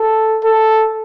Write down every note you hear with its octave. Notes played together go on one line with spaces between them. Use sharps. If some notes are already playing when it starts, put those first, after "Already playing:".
Already playing: A4
A4